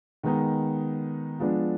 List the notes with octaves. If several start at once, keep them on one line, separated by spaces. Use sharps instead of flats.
D#3 G#3 B3 D#4
F3 G#3 B3 D4